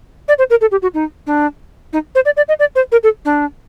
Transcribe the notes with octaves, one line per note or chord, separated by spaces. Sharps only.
D5
C5
A#4
A4
G4
F#4
D#4
D4
D#4
C5
D5
D5
D#5
D5
C5
A#4
A4
D4